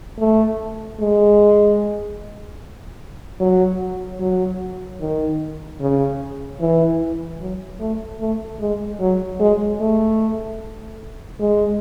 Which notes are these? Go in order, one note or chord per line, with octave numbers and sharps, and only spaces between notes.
A3
G#3
F#3
F#3
D#3
C#3
E3
F#3
A3
A3
G#3
F#3
G#3
A3
G#3